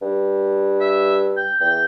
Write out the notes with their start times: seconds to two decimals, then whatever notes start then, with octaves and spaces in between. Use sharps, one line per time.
0.02 G2
0.81 E5
1.37 G5
1.61 E2 G5